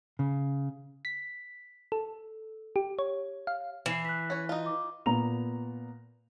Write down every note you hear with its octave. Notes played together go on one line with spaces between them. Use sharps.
C#3
B6
A4
G4
C#5
F5
E3 C7 E7
F#6 B6
C#4 C#5
D#4 F4
D6
A#2 B3 A#5 F7